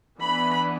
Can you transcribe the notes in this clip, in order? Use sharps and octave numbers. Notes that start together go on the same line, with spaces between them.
E3 B3 D4 B5